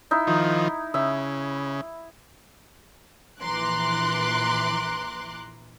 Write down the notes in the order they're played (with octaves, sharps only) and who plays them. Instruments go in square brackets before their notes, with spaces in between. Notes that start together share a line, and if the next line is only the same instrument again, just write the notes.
[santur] D#4 E4
[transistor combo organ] D#3 F3
[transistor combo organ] C#3 [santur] E5
[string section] A#1 E3 A#5 C6 D6 F#6